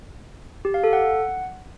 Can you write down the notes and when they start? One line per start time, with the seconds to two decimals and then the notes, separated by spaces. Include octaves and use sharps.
0.65 G4
0.74 F5
0.84 A4
0.93 F#5